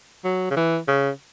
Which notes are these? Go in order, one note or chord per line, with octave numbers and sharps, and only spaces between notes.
F#3
C#3
E3
C#3